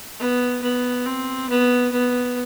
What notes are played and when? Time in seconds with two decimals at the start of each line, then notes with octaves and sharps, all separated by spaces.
0.19 B3
0.62 B3
1.06 C4
1.49 B3
1.92 B3